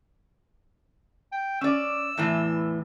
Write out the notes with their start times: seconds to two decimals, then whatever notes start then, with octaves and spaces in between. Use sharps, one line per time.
1.32 G5
1.61 C#4 D5 E6
2.18 E2 A2 E3